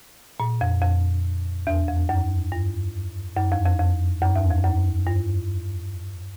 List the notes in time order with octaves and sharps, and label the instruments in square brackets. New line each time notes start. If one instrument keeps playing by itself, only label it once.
[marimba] A#2
F2
F2
E2
F2
F#2
G2
F#2
F2
F2
F2
F#2
E2
F2
F#2
G2